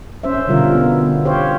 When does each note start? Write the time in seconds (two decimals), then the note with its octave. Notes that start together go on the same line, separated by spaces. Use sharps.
0.23 C#4 C5 E5
0.48 B2 D3 G3 F4 A#4
0.75 B3
1.25 G4 C5 C#5 F5